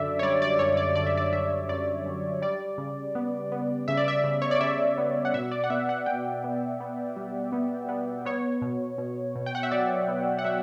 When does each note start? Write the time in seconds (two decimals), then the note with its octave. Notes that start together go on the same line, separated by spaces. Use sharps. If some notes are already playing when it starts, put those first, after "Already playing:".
Already playing: F#2 D3 D5 E5
0.19 C#5
0.23 G3 D5
0.42 D5
0.59 F#2 C#5
0.77 D5
0.95 D3 D5
1.06 E5
1.17 D5
1.33 D3 E5
1.69 F#2 D5
2.06 F#2
2.42 G3 D5
2.78 C#3
3.15 B3
3.52 B3
3.88 C#3 E5
3.97 D5
4.08 E5
4.24 C#3
4.42 C#5
4.51 D5
4.61 C#3 E5
4.98 B3
5.25 F#5
5.34 B2 E5
5.51 D5
5.64 F#5
5.70 B3 E5
5.89 F#5
6.06 B2 G5
6.44 B3
6.80 B3
7.16 G3
7.52 B3
7.89 B3
8.25 B3 C#5
8.62 B2
8.98 B2
9.36 B2
9.46 G5
9.55 F#5
9.63 E5
9.71 F#3 D5
10.08 B3
10.39 F#5
10.44 F#3 E5